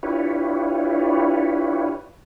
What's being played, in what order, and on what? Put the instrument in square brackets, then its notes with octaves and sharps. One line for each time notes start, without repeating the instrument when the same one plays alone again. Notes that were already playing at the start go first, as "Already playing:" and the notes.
[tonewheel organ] D4 E4 F4 G4 B4 C#5